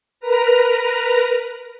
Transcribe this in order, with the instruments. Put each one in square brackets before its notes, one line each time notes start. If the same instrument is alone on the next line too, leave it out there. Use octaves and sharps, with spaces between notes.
[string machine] A#4 B4 A#5